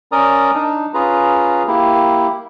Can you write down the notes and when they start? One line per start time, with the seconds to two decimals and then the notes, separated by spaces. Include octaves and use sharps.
0.12 C#4 A#4 D5 A#5 D#6
0.54 D4 D#4
0.94 C#4 F4 G#4 B4 A#5
1.67 A#3 E4 G4